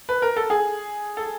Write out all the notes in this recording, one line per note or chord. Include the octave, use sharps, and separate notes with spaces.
B4
A#4
A4
G#4
A4